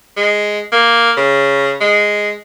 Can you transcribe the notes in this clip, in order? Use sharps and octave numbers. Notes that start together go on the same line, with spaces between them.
G#3
A#3
C#3
G#3